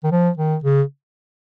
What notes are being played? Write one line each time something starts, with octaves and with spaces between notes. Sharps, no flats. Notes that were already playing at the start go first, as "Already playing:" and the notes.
D#3
F3
D#3
C#3